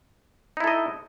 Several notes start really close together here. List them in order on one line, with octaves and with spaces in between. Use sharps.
D#4 E4 A4 D#5